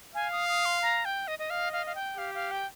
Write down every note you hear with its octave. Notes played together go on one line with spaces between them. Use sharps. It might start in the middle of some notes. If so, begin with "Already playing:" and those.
F5 G#5
D#6
D#6
C6
A#5
G5
D#5
D#5
D#5 F5
F5
F5
G5
G4 F5
F5
G5